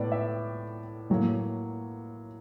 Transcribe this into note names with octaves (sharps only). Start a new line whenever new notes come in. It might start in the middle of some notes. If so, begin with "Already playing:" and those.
Already playing: A2 B3 D5
E5
A2 F#3 A#3